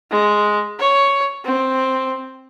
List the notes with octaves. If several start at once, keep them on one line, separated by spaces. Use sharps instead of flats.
G#3
C#5
C4